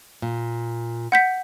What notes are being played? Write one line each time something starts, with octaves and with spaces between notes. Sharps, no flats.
A#2
F#5 G6 B6